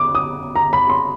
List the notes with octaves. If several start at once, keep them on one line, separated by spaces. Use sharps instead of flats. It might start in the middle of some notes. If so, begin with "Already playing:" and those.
Already playing: D6
D#6
A#5
B5
C6